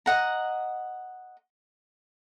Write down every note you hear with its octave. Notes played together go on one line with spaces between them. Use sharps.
D#5 F#5 A#5